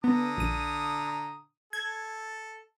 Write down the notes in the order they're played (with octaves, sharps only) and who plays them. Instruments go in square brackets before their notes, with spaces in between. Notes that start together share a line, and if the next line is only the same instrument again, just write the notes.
[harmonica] D3 A#5 D#6 [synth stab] B3
[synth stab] A#1 D#7
[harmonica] A4 [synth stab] G#6